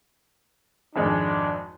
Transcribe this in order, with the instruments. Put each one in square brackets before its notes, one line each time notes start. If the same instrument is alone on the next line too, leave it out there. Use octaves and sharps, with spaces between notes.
[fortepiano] G#1 F2 G#3 [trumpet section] D4